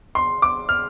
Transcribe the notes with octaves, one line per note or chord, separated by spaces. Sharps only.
C6
D6
F6